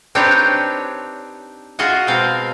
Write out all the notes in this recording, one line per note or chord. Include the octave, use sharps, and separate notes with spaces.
C4 D4 D#4 G4 B4 C#5
F4 F#4 G#4 D#5 F#5
B2 G#3 C4 F5 A#5